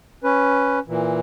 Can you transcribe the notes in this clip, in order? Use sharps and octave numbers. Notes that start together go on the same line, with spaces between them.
C#4 B4
A#2 E3